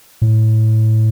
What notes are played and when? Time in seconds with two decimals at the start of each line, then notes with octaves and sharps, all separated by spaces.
0.22 A2